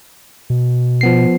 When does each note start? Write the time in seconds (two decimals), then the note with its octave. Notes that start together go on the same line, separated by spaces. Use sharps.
0.50 B2
1.01 F3 B3 C7